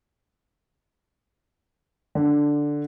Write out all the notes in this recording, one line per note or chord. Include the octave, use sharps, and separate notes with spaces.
D3